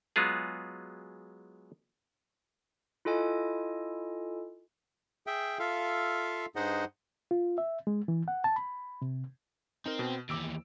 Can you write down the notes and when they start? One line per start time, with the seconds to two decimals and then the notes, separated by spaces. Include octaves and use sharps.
0.16 F#3 G#3 B3 F4 G#4
3.05 E4 F4 A4 D#5 G#5
5.27 G#4 E5 G5
5.59 F4 A4 E5 F5
6.56 G2 D#4 G#4 C5 D#5 F#5
7.31 F4
7.58 E5
7.87 G#3
8.08 E3
8.28 F#5
8.44 A5
8.56 B5
9.02 C3
9.86 C4 D#4 A#4
9.99 B2 B3
10.29 D#2 E3 D6 E6 D7